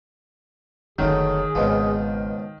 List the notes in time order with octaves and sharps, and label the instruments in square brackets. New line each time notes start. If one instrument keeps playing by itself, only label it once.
[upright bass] F#1 D3 [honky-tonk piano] D#3 [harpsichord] F#3 A3 [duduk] G#4
[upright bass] G#1 [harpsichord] C#2 B2 F3